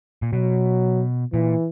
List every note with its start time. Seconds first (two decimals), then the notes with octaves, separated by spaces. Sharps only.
0.22 A#2
0.33 B2 F#3
1.33 A#2 E3